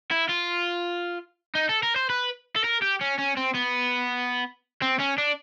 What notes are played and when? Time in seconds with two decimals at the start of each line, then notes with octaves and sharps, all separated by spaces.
0.11 E4
0.29 F4
1.55 D#4
1.69 A4
1.83 A#4
1.96 C5
2.10 B4
2.56 A4
2.64 A#4
2.82 G4
3.01 C#4
3.18 C#4
3.37 C4
3.54 B3
4.82 C4
4.99 C#4
5.18 D4